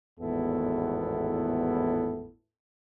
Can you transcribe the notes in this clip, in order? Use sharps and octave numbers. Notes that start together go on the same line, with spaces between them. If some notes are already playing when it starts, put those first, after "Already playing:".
G#1 E2 A2 B3 E4 A4